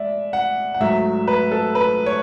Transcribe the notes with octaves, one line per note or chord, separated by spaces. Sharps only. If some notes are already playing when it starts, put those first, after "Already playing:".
Already playing: G#3 D5 E5
F#5
F#5
G#2 F#3 A3 E5
B4
A4
B4
C#5